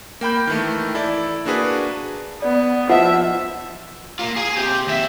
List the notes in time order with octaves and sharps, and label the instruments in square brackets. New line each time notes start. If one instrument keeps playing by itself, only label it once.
[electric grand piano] A#3 G5 B5 G6
D#3 E3 A3
E4 A4 D5
A#3 D4 F#4 G#4 B4
[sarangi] B3 [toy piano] D5
[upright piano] F3 [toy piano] D#5 F#5 [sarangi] E5
[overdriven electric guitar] A#3 F4
G#4 G#5
C4 G4
D#2 E5